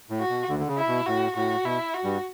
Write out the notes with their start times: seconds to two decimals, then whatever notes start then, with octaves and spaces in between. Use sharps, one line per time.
0.10 A2
0.19 F#4
0.29 B2
0.49 D2 D3
0.59 D3
0.68 C#3
0.77 E4
0.87 B2
1.06 A2 F#4
1.36 A2 F#4
1.65 B2 E4
1.94 F#4
2.04 G2 G3